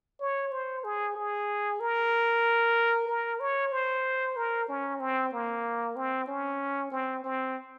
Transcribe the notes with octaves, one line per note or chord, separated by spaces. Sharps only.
C#5
C5
G#4
G#4
A#4
A#4
C#5
C5
A#4
C#4
C4
A#3
C4
C#4
C4
C4